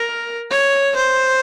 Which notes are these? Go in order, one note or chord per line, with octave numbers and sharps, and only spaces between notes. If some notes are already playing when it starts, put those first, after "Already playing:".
Already playing: A#4
C#5
C5